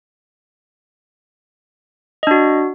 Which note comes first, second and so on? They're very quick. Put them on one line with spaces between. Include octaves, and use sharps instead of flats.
D#5 D4 F#4